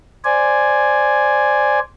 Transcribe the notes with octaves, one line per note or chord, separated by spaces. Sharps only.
C5 D5 G#5